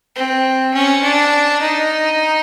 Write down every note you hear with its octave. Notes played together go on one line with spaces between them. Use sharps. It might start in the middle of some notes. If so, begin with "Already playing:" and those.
C4
C#4
D4
D#4